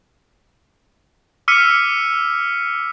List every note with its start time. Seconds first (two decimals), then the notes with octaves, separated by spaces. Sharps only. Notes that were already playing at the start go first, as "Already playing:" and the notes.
1.48 D6 E6 F6 B6 C#7 D#7